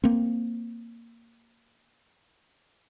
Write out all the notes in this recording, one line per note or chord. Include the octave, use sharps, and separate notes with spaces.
A#3 C4